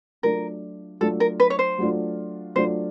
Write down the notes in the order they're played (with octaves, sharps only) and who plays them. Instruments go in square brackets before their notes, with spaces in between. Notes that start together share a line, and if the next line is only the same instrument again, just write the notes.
[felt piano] F#3 A3 D4 F4 [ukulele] A#4
[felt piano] F#3 A3 D4 F4 [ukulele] A4
[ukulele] A#4
B4
C#5
C5
[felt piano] F#3 A3 D4 F4
[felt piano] F#3 A3 D4 F4 [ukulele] C5